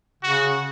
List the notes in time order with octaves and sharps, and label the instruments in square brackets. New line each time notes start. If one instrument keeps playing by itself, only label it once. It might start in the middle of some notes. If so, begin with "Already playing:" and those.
[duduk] C#3 [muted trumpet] F#4